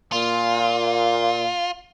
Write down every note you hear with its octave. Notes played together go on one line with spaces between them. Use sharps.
A#2 F4